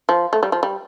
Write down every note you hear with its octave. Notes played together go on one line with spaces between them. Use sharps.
F3
A3
G3
F3
G3